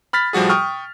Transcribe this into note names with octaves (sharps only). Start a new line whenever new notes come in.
B5 F6 A6 B6
A2 F3 G3 F#4 G#4
G5 C#6 D#6 F6